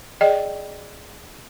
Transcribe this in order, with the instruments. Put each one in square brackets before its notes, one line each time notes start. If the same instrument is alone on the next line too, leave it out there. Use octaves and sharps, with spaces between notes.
[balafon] G#4 D5 D#5 G5